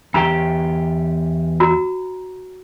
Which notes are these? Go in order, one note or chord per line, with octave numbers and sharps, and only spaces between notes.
E2 G4 G5 A#5
F#4 A#5